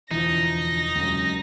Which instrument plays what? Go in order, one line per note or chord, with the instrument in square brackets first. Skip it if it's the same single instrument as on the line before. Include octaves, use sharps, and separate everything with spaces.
[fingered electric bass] E1 D2 [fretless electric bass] E3 F3 [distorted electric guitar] D#4 [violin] A#6
[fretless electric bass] C#2 F#2